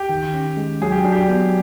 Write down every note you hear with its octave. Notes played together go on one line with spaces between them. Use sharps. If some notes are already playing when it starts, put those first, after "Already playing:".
Already playing: G4
D#3
C#4
G#3
F#3 G#4
G4
D4
G4
B3